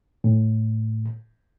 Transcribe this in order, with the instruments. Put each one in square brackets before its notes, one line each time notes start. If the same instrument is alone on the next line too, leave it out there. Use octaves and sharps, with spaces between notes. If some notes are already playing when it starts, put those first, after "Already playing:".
[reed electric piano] A2